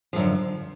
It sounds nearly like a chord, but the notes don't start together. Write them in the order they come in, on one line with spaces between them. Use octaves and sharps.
F3 F#2 D3